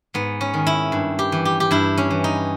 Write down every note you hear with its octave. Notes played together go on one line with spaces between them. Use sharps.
G#2 B3
C#4
D#3
E4
G2
G4
E3
G4
G4
G2 E4
C#4
E3
D#4